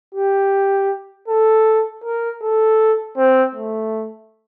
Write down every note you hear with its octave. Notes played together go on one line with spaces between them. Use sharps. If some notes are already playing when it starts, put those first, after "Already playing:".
G4
A4
A#4
A4
C4
A3